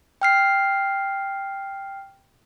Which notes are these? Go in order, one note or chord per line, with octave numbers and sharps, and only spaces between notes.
G5 F6 C7